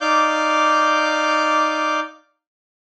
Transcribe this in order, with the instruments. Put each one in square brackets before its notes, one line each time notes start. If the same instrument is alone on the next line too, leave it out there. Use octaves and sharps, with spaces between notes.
[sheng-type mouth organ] D#4 D5 F5 D6 G6